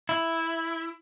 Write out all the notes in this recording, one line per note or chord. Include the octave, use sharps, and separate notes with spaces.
E4